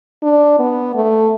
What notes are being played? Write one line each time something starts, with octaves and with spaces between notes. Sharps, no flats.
D4
B3
A3